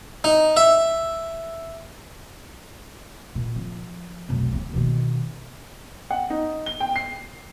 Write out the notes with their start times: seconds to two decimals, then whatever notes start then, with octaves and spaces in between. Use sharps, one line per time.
0.24 D#4
0.57 E5
3.35 A#2
3.56 F3
4.29 F1 B1
4.52 D#2 A#3
4.74 B2 D#3
6.11 F#5
6.30 D#4
6.66 G7
6.80 G5
6.96 C7